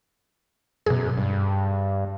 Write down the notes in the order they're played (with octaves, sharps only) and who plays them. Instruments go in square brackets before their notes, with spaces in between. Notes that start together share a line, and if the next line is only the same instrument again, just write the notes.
[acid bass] F#2 [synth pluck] B2 G#4
[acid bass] G2